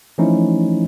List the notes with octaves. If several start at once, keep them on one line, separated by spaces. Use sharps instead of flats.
E3 F3 A3 C#4 D#4 E4